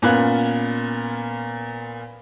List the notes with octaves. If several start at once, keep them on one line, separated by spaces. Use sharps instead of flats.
A#2 B3 C#4 F4 F#6